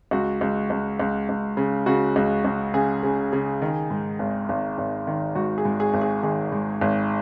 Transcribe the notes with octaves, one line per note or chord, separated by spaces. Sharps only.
C#2 F#4
C#2
C#2
C#2
C#2
C#3
C#3 F#4
C#2
C#2
C#3 G#4
C#3
C#3
D#3
G#2
G#1
G#1
G#1
D#3
G#2 F#4
G#4
G#2
G#4
G#1
G#4
D#3 G#4
G#2
G#1